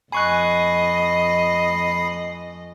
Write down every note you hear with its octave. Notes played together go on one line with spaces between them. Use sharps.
F2 D#5 G#5 B5 C#6 F#6 C7